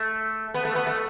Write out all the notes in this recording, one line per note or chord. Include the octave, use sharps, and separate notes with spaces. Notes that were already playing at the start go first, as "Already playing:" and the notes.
Already playing: A3
B3
A3
B3
A3